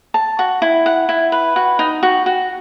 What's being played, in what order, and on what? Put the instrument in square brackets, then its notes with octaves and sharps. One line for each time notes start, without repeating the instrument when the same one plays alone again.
[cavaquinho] A5
F#4
E4
F#5
E4
B4
F#4
D#4
F#4
F#4